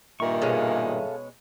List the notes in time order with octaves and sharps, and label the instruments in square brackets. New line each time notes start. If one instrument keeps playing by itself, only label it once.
[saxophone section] G2 A#2 D#3 [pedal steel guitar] A#4 C#6 [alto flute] E5
[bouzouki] B2 G#3 C#4 [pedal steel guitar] A4 F5 G#5